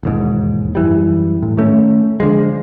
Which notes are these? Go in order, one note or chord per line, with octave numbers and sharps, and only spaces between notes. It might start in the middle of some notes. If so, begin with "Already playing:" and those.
E1 D#2 G#2
F#2 E3 G3
A2
D#3 A3 C4 C#4
D3 F3 G#3